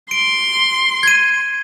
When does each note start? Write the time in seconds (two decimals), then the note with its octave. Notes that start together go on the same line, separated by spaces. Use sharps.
0.11 C6 D7
1.03 G#6 D#7